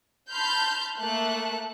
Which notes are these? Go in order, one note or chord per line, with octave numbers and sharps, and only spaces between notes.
A5 B5 C6 F6 G6
A3 A#3 A5 F#6